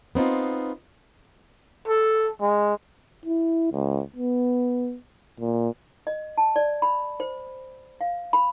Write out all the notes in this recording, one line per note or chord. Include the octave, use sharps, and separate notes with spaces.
B3 C4 D#4 F4
A4
G#3
E4
C#2
B3
A#2
D#5
A5
D5
B5
C5
F5
B5